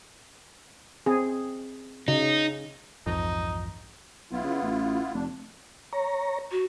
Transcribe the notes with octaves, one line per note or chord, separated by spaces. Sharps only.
C4 G#4
C#3 D#4
B1 F2 G#2 E3 D#4
B1 B3 E4 F4
C#3
A1
F1 D4
C#5 A#5
F#4